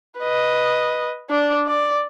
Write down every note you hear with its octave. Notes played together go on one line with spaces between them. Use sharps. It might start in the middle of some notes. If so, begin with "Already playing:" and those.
B4 D#5
D4 D5
D5